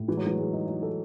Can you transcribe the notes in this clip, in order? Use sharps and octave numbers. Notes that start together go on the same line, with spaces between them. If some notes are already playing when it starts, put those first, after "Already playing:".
Already playing: A2
E3 G#3
F#3
E3 G#3
G#3
D#4
D#4
A4